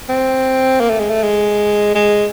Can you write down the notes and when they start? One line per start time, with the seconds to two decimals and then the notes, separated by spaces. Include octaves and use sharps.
0.09 C4
0.80 A#3
0.90 A3
1.00 G#3
1.10 A3
1.23 G#3
1.95 G#3